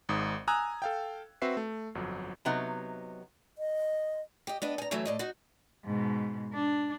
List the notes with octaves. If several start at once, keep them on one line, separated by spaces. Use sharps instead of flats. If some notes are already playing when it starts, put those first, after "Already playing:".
G#1 G#2 D#6
G#5 A#5 D#6 E6 F#6 G#6
A4 F5 G5
C4 F#4 B4 E5 C7
A3
G1 F2 F#3
C3 F#3 B3 D#4
D#5
G4 D#5
B3 D4 D#5
G#5 A#5
E3 F#3 A3 C#4 E4
A2 D5 D#5
D#4 F#4
G#2 B2
D4